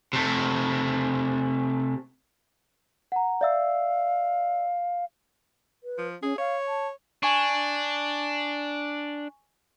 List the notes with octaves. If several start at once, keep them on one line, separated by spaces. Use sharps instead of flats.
C3 A3
F#5 A#5
D5 E5 F5 E6
B4
F3
C#4 G#4
C#5 F5
A5
D4 G#5 C#6